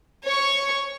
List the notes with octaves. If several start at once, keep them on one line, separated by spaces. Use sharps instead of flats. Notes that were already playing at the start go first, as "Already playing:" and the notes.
C#5 C#6